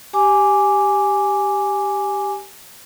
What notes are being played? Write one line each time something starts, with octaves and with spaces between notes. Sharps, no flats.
G4 G#5 D6